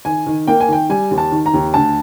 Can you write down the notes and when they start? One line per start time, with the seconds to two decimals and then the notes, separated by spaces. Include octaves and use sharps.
0.05 D#3 G#5
0.26 D#3
0.47 A#3 G5
0.61 G#5
0.68 D#3 G5
0.89 G3 G#5
1.11 D#2
1.18 A5
1.32 D#3
1.46 A#5
1.54 D#2
1.74 D2 A5